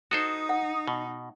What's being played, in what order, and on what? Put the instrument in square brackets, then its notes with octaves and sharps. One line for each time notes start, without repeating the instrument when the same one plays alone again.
[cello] D#4 [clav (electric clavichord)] F#4 A4 C5 [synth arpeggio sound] D#6
[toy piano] F#5
[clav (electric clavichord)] B2